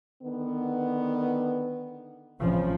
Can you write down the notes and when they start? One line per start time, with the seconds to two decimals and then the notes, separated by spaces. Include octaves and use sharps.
0.23 D3 D#3 B3
2.42 A1 C#3 F3 C4